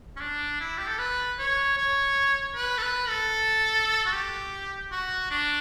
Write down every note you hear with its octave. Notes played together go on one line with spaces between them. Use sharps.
C#4
D4
E4
G4
A4
B4
C#5
C#5
B4
A4
B4
A4
F#4
G4
F#4
D4